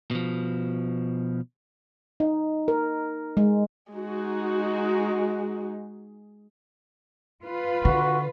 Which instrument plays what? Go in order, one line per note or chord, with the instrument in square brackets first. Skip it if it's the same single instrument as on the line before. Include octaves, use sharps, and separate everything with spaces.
[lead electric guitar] B2 F3
[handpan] D#4
A#4
G#3
[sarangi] G#3 [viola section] D#4 F#4
[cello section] F4 B4
[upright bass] D3 [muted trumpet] F#4